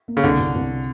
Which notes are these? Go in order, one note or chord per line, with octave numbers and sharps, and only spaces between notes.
A#3
C#3
C2 D3
C2
C2
C3